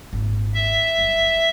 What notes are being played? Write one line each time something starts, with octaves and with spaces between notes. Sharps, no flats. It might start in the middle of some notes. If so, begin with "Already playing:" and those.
G#1 A#2
E5
G1 F#2